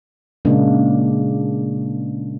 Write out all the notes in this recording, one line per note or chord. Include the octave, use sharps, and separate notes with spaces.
A#2 C#3 G#3 A#3 D4